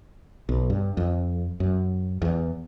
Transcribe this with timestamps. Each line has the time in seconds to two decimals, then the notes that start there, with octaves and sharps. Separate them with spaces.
0.49 B1
0.70 G2
0.97 F2
1.60 F#2
2.22 E2